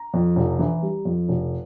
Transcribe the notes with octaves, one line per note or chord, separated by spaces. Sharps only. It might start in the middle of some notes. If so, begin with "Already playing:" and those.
Already playing: A#5
F2
F1
E3
G3
F2
F1